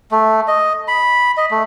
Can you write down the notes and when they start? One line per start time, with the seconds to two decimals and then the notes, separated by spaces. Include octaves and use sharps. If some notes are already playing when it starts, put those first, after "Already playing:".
0.11 A3
0.48 D#5
0.88 B5
1.37 D#5
1.51 A3